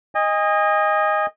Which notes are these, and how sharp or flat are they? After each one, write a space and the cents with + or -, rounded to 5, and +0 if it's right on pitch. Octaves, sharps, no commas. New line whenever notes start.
D#5 +0 G#5 -35